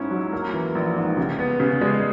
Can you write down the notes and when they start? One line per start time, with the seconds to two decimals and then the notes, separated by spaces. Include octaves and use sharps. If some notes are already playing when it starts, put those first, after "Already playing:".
Already playing: G#2 C#4 E4
0.11 F#3
0.33 A#3
0.53 E3
0.75 A#1
0.97 G#2
1.17 C#3
1.39 B3
1.60 C#3
1.81 G#3